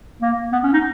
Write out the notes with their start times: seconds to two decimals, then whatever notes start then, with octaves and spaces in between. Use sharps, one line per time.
0.22 A#3
0.53 B3
0.63 C#4
0.73 D#4